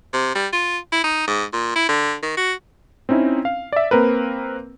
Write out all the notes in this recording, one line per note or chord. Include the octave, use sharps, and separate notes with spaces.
C3
G3
F4
E4
D#4
G#2
A#2
E4
D3
D#3
F#4
C4 C#4 D#4 E4
F5
D5 E5
A#3 C4 A#4 B4